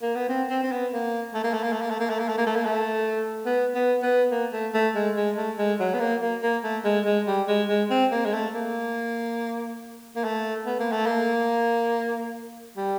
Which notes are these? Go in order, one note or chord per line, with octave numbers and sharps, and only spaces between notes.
A#3
B3
C4
C4
C4
B3
A#3
A3
A#3
A3
A#3
A3
A#3
A3
A#3
A3
A#3
A3
A#3
A3
A#3
A3
B3
B3
B3
A#3
A3
A3
G#3
G#3
A3
G#3
F#3
B3
A#3
A#3
A#3
A3
G#3
G#3
G3
G#3
G#3
C4
A#3
G#3
A3
A#3
A#3
A3
B3
A#3
A3
A#3
G3